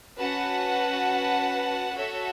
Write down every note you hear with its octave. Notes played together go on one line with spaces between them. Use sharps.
C#4 F#4 B4 F#5 A5
F#4 A4 C#5 E5